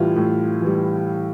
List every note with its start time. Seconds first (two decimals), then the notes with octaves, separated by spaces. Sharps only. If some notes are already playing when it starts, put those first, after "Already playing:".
Already playing: A2 E3 G3 E4 F4
0.16 A2
0.62 E3 G3